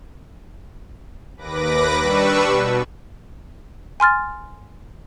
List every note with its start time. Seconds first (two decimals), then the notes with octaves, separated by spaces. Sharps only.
1.36 D#2 B4 D6 A#6
2.00 G3 D4 B4 C#6 E6
2.43 B2
4.00 G#5 C6 F6 A6